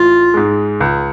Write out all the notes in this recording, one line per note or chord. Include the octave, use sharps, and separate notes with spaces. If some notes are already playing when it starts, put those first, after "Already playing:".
Already playing: A1 F4
G#2 G#3
C#2